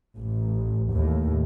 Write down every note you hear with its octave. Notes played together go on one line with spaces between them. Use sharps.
A1
D#2 A2